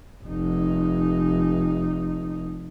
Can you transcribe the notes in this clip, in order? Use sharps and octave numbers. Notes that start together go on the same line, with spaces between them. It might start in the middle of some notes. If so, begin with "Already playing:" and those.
F1 D#4